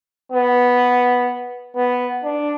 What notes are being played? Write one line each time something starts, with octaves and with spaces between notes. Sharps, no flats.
B3
B3
D4